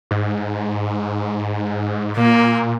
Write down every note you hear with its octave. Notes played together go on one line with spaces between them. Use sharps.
G#2
A#2 A#3